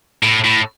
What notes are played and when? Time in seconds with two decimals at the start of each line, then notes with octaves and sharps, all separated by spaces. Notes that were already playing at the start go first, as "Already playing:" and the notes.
0.23 A2
0.44 A2